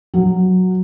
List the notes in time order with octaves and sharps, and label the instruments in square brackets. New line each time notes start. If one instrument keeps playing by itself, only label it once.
[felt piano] F#3